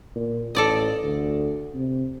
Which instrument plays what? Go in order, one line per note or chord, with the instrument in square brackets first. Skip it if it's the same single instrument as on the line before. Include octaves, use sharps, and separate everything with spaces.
[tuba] A#2
[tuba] A1 [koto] A4 D5 D#5
[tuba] D2
C3